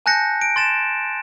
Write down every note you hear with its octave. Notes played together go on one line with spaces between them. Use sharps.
G#5 A5 F#6 G6 A#6 C#7
D7
C6 A6 E7